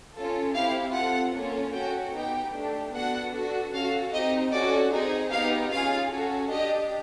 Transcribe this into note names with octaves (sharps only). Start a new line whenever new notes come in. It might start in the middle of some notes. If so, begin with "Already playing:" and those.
C#4 F4 A4
C4 E4 G4 F5
C4 F4 A4 F#5
A#3 C#4 F4 A4
C#4 F#4 A4 G5
B3 D#4 G4 G5
A3 D4 G4
B3 D4 F#4 A4 F#5
D4 F#4 A4
C#4 F#4 A4 F5
C4 D#4 G4 D#5
C#4 F#4 A4 D5
C4 D#4 G#4
B3 D#4 G4 F5
C#4 F4 G#4 F5
C#4 F#4 A4
D4 G4 D#5